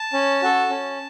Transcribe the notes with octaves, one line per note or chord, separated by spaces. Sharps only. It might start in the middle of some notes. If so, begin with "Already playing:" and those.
Already playing: A5
C#4
F#4 A4
C#4